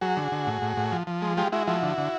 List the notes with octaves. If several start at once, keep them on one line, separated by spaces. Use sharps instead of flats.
F#3 F#4 G#4
D3
D3
A2
A2
A2
F3
F3
G#3
G#3 F4 G4
G#3 E4 F#4
F3 E4 F#4
D3
D3